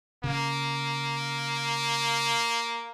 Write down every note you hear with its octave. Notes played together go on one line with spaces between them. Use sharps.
C#3 A#3